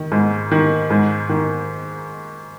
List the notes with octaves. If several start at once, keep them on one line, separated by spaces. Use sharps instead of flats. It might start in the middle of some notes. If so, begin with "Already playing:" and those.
Already playing: D#3
G#2
D#3
G#2
D#3